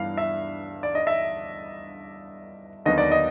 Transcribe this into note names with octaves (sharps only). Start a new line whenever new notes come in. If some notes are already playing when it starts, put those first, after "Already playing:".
Already playing: G2 E3 B3 F5
E5
D5
D#5
E5
D#2 D3 F#3 B3 D#5
D5
D#5